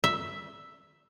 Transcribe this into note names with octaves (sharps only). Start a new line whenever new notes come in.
E5